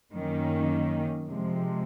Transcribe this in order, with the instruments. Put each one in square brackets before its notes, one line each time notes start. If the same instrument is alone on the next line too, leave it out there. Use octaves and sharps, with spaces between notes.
[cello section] F#2 D#3 A#3 C#4
F2 C3 F3 G#3